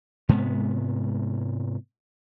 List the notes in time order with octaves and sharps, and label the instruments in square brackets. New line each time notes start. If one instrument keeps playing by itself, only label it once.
[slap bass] G#2 C3 G#3 B3